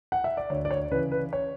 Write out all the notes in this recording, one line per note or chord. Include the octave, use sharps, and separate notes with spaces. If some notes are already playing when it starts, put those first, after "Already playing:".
F#5
E5
D5
D2 C#5
D5
C#5
C#3 E3 B4
B4
C#5